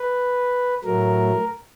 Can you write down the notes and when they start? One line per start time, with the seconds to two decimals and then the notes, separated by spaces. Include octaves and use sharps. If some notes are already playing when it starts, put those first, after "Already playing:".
Already playing: B4
0.85 A2 F#3 A3 A#4